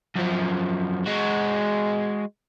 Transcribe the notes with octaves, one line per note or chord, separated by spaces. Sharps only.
F#2 F3
G#3 F#4